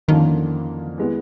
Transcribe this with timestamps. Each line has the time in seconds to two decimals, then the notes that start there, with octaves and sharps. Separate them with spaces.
0.08 F2 D3 D#3 F3 A#3 C#4
0.98 E3 G#3 B3